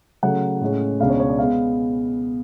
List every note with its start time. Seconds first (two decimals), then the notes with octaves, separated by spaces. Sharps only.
0.23 C#3 F#3 A3 F#5
0.61 A2 G#3 C#4
1.00 C#2 B2 G#3 D4 F5
1.09 C#5
1.20 C#5
1.29 D5
1.39 G#3 B3 F5